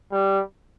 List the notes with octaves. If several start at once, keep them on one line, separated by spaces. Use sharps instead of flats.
G3